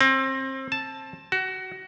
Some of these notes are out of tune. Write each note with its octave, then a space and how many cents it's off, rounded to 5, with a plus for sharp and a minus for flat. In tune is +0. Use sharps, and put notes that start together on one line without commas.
C4 +30
A5 +0
F#4 +20